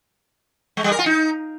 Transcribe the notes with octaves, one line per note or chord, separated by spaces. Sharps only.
G#3
G3
A#4
F4
D#4